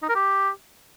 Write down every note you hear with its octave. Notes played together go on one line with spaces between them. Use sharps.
D#4
A#4
G4